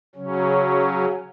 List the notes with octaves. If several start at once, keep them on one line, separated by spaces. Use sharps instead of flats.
C#3 F#3 C#4